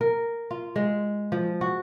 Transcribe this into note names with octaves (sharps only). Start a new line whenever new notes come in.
A#4
F4
G#3
F3
F#4